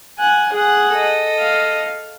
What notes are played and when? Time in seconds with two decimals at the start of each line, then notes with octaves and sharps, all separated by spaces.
0.19 F#5 G#5
0.52 G#4 F#5
0.90 A4 D#5
1.39 F5